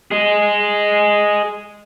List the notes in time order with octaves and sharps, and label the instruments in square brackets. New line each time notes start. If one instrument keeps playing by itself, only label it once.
[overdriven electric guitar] G#4 D#5